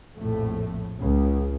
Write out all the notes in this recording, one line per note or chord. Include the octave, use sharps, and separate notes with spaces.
A#1 F2 A2 A3
C#2